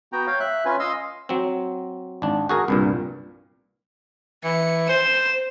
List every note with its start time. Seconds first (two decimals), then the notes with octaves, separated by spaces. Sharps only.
0.13 B3 F#4 G5 A#5
0.27 C#5 F5 G5
0.40 E5 F#6
0.65 C#4 F4 B4 G#5
0.80 D#5 F5 C6 E6
1.29 F#3 C4
2.22 G#1 D4
2.49 F#4 G#4 A#4
2.68 C2 G2 A#2
4.44 E3 C#7
4.89 C5 E7